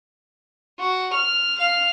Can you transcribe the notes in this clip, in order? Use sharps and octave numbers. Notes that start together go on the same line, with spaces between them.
F#4
F6
F5 F6